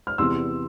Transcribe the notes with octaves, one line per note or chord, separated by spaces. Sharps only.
F6
E2 C3 E3 C6 E6